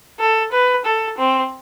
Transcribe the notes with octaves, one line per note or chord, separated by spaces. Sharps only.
A4
B4
A4
C4